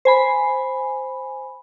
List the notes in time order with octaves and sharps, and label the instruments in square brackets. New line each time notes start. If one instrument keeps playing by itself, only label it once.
[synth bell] C5 G#5 B5